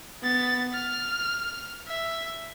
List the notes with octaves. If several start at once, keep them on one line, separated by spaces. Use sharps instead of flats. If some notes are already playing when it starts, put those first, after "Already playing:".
B3 A6
F6
E5